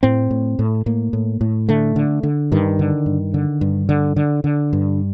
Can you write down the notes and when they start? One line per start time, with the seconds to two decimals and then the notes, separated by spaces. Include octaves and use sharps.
0.03 A2 C4
0.31 A2
0.59 A2
0.86 A2 A#3
1.13 A2
1.41 A2
1.69 D3 A3
1.96 D3
2.23 D3
2.52 G2 D#3
2.79 D3
3.06 G2
3.34 D3
3.61 G2
3.89 D3
4.16 D3
4.44 D3
4.73 G2